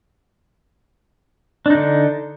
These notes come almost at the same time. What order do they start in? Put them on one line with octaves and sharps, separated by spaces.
D4 D#4 D3